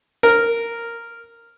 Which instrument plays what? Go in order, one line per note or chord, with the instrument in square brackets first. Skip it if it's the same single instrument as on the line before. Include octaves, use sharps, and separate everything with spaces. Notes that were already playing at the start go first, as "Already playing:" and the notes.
[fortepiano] A#4